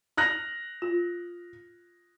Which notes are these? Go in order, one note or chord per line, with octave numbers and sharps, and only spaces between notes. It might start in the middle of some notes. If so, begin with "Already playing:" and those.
F6 F#6 A#6
F4